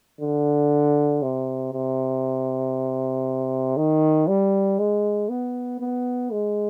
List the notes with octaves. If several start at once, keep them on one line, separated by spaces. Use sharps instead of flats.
D3
C3
C3
D#3
G3
G#3
B3
B3
G#3